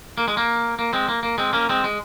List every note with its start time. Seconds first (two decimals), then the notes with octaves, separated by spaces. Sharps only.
0.18 A#3
0.28 G#3
0.37 A#3
0.79 A#3
0.93 G#3 C4
1.09 A#3
1.23 A#3
1.38 G#3 C4
1.53 A#3 C#4
1.69 G#3 C4
1.84 G#3